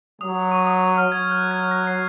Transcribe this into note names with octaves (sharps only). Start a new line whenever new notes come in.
F#3 D#6
C#6
D#6
D#6
F6
F#3 G#6
F#6
G#6
A#6
C7